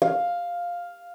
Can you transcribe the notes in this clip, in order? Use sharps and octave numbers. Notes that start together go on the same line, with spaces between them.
F5